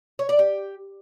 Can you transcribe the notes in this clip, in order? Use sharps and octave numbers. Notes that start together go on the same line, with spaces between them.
C#5
D5
G4